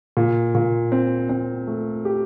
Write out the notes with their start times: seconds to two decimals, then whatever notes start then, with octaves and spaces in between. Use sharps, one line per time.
0.17 A#2
0.55 A#2
0.92 C4
1.29 C4
1.67 A3
2.05 G4